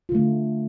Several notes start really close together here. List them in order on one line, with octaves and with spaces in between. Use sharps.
F4 D3 A3